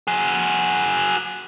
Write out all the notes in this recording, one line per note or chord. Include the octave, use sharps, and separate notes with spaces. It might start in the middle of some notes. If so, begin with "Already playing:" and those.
F#4 G#4